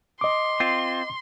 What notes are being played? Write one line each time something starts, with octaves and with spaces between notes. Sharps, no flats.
D#5 C6 D6
C4 F4